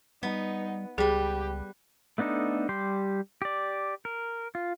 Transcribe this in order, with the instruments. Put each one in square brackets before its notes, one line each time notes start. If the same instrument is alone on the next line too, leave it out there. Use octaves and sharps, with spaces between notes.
[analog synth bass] G3 [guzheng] B3 [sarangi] D#4
[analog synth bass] C#2 [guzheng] G3 B4 [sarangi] G4 [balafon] G#4
[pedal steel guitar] A3 B3 D4 D#4 A4
G3 G4 C6
G4 D5
A#4
F4